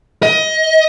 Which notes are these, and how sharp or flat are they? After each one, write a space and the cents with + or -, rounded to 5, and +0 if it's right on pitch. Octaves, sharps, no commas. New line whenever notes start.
D#5 +25